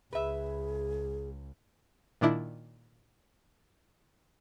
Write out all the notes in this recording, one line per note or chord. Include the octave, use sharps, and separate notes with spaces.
C#2 G#4 B4 E5
A#2 D#3 D4 E4